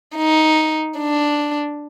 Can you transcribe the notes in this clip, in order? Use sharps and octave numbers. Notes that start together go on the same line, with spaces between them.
D#4
D4